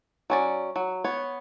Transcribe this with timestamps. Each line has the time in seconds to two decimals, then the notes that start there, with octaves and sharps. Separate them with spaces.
0.30 F#3 C#4 D5
0.76 F#3
1.04 B3 C#5